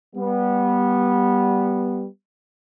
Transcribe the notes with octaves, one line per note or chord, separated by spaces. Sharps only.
G3 B3